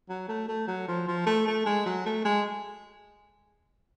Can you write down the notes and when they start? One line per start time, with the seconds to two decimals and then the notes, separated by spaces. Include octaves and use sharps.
0.09 F#3
0.28 A3
0.48 A3
0.67 F#3
0.88 F3
1.07 F3
1.26 A3
1.47 A3
1.66 G#3
1.86 F#3
2.06 A3
2.25 G#3